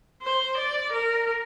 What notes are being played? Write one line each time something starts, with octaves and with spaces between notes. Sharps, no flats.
C5
D5
A#4